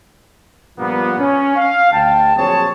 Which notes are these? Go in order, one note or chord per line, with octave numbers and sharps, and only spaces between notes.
G2 A#2 F3 A#3 B3
C#4
F5
D2 G5 A5
A#1 F#3 C4 G#4 C#5 A5